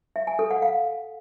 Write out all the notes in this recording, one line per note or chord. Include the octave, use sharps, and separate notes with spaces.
E5
G#5
A4
F#5
F5